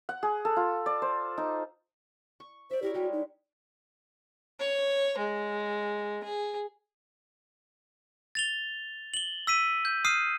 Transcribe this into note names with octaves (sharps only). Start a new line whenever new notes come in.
F#5
G#4
A4
F4
D5
C5
D#4
C#6
C5 D5 E5
E4 G4 A#4 C#5
G3 G#3 F#4
D#4
C#5
G#3
G#4
A6 F7 G7
F#7 G7
E6 B6 D#7
G6
D#6 F6 C7 D#7